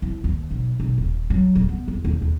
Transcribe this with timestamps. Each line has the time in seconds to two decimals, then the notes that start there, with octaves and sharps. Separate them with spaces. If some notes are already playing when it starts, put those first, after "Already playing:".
0.02 C2
0.24 D#2
0.51 B1
0.80 B1
0.98 D#1
1.30 F#3
1.55 D#1
1.69 B3
1.88 E2
2.05 D#2
2.22 D#2